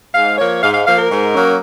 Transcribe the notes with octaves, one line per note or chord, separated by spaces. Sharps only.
G#2 F5
F3 A#3 C#5
G#2 F5
F5
F3 A#3 F5
A#4
G#2
F#3 A#3 C#4